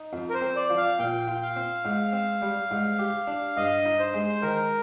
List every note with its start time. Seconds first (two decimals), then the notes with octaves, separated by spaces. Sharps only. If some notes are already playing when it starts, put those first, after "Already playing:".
Already playing: D#4
0.13 F2
0.30 A#4
0.34 C5
0.41 C4
0.56 D5
0.70 F3
0.77 F5
0.99 A#2 G5
1.28 F4
1.42 F5
1.56 C4
1.85 G#2
2.13 C4
2.42 G3
2.71 G#2
2.99 G4
3.27 D4
3.57 G2 D#5
3.85 D#4
3.99 C5
4.14 G#3
4.42 D#3 A#4